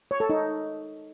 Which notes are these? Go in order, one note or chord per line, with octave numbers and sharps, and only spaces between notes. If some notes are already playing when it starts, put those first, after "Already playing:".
C#5
A4
D#4